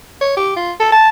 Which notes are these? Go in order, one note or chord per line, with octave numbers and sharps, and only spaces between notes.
C#5
G4
F4
A4
A5